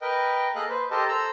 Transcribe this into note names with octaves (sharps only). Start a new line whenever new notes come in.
A#4 B4 D#5 G5
A#3 G#4 A4 D#5 F5 F#6
B4 C5
G4 A4 A#4 C5 D#5 A5
A4 C5 A#5 E6